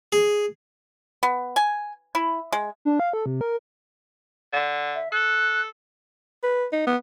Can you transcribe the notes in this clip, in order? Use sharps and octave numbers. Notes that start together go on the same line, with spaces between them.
G#4
B3
G#5
E4
G#3
D4
F5
A4
C3
A#4
D3
E5
A4 F#6
B4
D#4
B3